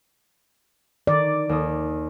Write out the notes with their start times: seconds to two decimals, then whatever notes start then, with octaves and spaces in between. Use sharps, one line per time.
1.07 D#3 D5
1.49 D#2 D#6